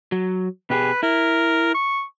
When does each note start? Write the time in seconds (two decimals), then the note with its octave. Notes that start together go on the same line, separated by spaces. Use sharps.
0.12 F#3
0.70 B2 G4 G#4 B4
1.03 E4 A#4
1.74 C#6